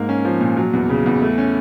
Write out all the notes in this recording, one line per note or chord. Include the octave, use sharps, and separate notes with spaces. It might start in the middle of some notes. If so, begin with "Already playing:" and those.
Already playing: G#2 A#3
C#4
F3
A#2
F#3
E2
C#3
E2
A3
C#4